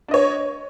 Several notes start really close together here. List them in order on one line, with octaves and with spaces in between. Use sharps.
D4 D#5 C#5